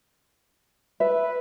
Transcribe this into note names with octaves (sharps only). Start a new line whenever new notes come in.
B4 E5